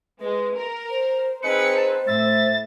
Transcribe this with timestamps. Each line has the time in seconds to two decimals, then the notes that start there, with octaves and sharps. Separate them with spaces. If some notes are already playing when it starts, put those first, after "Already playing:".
0.20 G#3 B4
0.56 A#4
0.90 C5
1.43 C4 D#4 G#4 B4 C5 C#7
1.77 A5
2.07 A2 E5 A6